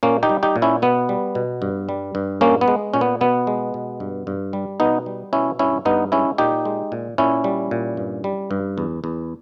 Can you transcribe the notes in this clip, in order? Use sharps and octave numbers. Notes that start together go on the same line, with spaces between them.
A#2 A#3 C#4
D#4 G4
G3
D#4 G4
A#2
C#4 E4
B2 B3
G3
B2
G2
G3
G2
A#2 A#3 C#4
B3
G#3
A#2 C#4
B3
B2 B3
G#3
B2
G2
G2
G3
B2 B3 D#4
G3
B2 C#4 E4
G2 C#4 E4
G2 B3 D#4
G#3 C#4 E4
A#2 D#4 G4
G#3
A#2
A#2 C#4 E4
G3
A#2
G2
G3
G2
E2
E2